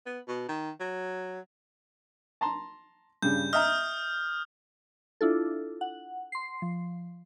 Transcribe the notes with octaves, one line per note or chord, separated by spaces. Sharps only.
B3
B2
D#3
F#3
A5 A#5 C6
G2 C#3 G6
D#5 E5 A#5 D#6 F6
D4 E4 F4 A4
F#5
C6 C7
F3